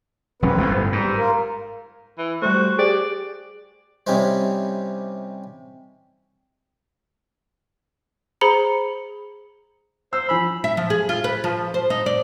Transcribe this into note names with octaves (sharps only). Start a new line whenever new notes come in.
E1 F#3 C4 C#4 B4
G1 A2
G#2 G3
F4 A#4
E3
G3 A3 F#4 C5
G4 G#4 D5
C3 G3 C#4 D#4 E4 C5
G#4 C5 A#5 B5 C#7 G7
C5 E6
F3 G#5 B5 E6
E5
F3
G#4
F4
B4
F3
C5
D#4
D5